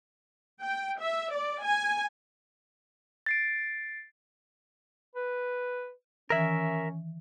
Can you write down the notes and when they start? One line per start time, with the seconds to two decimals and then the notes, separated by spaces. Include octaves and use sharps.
0.61 G5
1.00 E5
1.32 D5
1.63 G#5
3.26 A6 C7 D7
5.16 B4
6.30 D#3 E3 C#4 A#4 E5